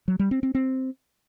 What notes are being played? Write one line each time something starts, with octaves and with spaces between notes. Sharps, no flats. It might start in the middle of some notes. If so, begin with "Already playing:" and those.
F#3
G3
C4
C4
C4